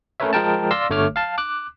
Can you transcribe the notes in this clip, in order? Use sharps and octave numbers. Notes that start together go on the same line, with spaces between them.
A3 C#4 A#4 B4 C#5 E5
F3 G#3 A#4 G5 A5
D5 F5 C6 E6 A#6
G1 D3 A3 C#5 D6 F6
F5 A5
D6 F#6